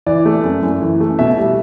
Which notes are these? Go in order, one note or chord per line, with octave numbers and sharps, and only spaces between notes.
E3 D5
A3
F#2
F#2
E3
A3
B2 E5
G3